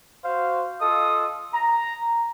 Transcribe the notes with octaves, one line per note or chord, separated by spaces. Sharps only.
F#4 C5 F5
F4 A4 D#5 D#6
A#5